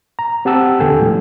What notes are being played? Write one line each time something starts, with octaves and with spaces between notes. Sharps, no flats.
A#5
C4 G4 F#5 A5 E6
D#2 D3 B3 A4 G5 G#5
A2 F3 G3